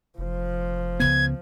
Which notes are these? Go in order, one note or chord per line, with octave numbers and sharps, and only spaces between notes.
F1 F3
C#2 C#3 B3 G#6